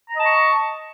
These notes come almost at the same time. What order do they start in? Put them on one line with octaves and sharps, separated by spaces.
A#5 D#5 A5 C#6